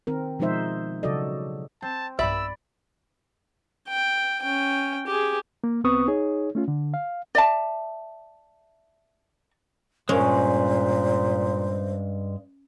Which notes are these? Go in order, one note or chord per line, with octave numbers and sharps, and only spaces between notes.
D#3 C4 A#4
B2 F3 G#3 D#4 C5 E5
C#3 F#3 F#4 A4 D5 D#5
C4 A5
B1 G2 D5 E5 B5 E6
G5
C#4 G5
G4 G#4
A#3
C2 B3 C4 B4 C#6 D#6
D#4 G#4 C#5
A3 C#4 F4
D3
F5
D5 E5 A5
G2 A#2 G#3 C#4 C5